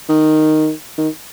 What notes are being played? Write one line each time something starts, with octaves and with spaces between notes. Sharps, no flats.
D#3
D#3